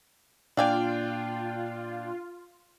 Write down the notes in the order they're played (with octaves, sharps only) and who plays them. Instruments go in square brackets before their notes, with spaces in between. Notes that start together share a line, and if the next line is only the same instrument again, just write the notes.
[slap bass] A#2 A#3 [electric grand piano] D4 G5 [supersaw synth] F4 [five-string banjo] D5 F5 G#5